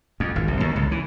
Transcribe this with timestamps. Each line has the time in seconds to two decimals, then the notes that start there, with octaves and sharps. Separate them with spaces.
0.20 F2
0.36 G#1
0.48 C2
0.60 D#2
0.76 C#2
0.92 E3